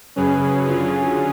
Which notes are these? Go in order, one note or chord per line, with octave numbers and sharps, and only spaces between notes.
F#2 C#3 F#3 C#4 G#4 B4
D3 F#3 C#4 F4 G#4